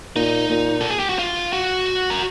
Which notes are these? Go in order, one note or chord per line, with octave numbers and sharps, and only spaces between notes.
A#2 D#4
A#2
A4
G#4
G4
F#4
F4
F#4
A#4